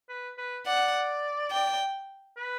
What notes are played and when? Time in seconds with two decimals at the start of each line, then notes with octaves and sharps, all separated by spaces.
0.09 B4
0.38 B4
0.66 D5 F#5
1.51 G5
2.37 B4